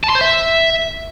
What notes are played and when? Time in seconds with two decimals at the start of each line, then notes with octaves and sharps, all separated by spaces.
0.04 A5
0.09 C6
0.15 C5
0.21 E5